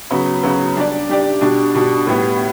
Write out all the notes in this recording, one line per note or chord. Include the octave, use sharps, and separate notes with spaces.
C#3 F#3 B3
C#3 F#3 B3
G3 D4 G4 D5
G3 D4 G4 D5
B2 G3 D4
B2 G3 D4
A2 G3 B3